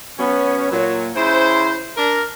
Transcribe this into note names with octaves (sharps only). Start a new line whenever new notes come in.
F#3 B3 C#4
A#2 F#3
C#3 E4 C5
D4 A#4